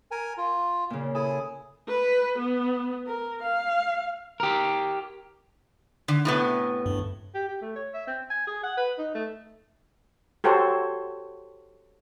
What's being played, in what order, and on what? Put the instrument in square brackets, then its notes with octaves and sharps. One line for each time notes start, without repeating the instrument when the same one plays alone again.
[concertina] A#4 G#5
F4
[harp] A#2 C#3
[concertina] E4 G#4 G#5 [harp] A4
[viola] B4
B3
A#4
F5
[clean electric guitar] G4 A#4
[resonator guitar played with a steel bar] D3
A2 C3 B3
[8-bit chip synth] G2
[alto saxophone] G4
G4
A3
C#5
E5
C4
G#5
G#4
F#5
B4
D#4
A3
[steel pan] F#4 G4 A4 C5 C#5